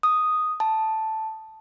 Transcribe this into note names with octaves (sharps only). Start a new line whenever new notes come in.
D#6
A5